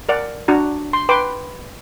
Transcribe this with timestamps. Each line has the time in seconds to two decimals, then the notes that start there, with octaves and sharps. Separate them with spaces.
0.09 A#4 D5 F#5
0.48 D4 F#4 A#5
0.93 C6
1.09 B4 G5 C6 D6